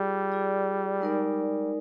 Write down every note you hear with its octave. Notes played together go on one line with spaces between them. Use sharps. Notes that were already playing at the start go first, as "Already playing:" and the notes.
Already playing: G3 F4 G#4 D5
F4 G#4 D5
G#3 D#4 A#4 D5